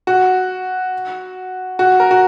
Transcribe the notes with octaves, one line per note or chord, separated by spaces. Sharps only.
F#4
F#4
A#4
F#4